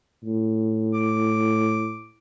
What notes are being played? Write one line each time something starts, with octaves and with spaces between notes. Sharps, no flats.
A2
D6